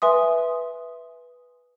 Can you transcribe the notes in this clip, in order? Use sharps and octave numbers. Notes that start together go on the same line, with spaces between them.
B4 E5 G#5 C6 D#6